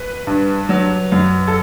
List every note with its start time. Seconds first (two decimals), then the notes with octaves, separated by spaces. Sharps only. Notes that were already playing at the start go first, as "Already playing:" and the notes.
Already playing: B4
0.27 G2
0.69 F#3
1.12 F#2
1.48 A4